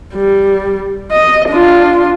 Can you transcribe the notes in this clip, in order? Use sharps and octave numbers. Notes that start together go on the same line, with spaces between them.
G3
D#5
D4 F4